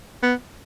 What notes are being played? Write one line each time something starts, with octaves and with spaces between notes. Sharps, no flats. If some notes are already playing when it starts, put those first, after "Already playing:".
B3